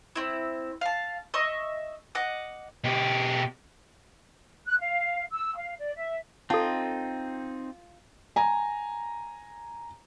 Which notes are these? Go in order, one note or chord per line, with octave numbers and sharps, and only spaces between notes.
C4 E4
F5 A5
D#5 E5 C#6
D#5 F#5 D6
B2 G4
F#6
F5
E6
F5
D5
E5
C4 D#4 F4 A4 A5
G#5 A#5